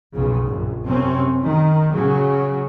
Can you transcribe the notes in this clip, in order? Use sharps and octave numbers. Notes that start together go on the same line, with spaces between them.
B1 F2 C#3
A#1 F#2
F#2 C3 C4 C#4
D#3
C#3 F#3